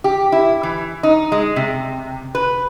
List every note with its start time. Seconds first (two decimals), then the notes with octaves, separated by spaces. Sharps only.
0.04 G4
0.32 E4
0.63 E3
1.03 D#4
1.32 G#3
1.56 C3
2.35 B4